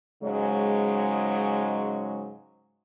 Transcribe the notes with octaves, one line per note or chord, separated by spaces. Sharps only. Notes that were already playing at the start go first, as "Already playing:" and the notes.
G#2 C#3 F#3 G#3